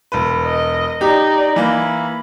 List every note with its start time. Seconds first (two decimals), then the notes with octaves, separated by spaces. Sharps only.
0.12 E1 B4
0.46 D#5
1.01 D#4 G4 D5
1.56 E3 A#3 B5